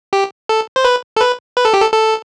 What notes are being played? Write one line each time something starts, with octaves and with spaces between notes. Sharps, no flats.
G4
A4
C5
B4
A4
B4
B4
A4
G4
A4
A4